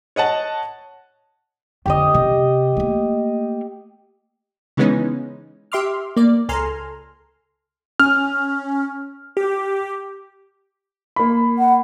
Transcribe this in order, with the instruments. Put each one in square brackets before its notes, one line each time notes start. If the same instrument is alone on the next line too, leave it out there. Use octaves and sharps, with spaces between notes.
[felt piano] C#5 D#5 F#5 A5
[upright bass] F2 D3 [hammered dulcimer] G4 D#5
[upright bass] C3
A3 A#3
[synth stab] C#3 E3 G#3 B3 C#4 D#4
G4 E5 C6 D6 F6
A#3 D5
C#2 A4 G#5 A#5 C6 F6
[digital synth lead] C#4 [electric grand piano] F6
[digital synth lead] G4
[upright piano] A#3 B5
[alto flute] F#5